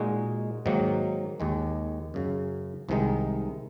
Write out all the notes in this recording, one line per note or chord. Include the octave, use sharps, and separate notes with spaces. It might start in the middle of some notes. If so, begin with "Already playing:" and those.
Already playing: A#2 G#3 D#4 F#4
G#2 D#3 F#3 A#3
D#2 D#3 G#3
F#2 C#3 F#3
C2 C3 D#3 G#3 D#4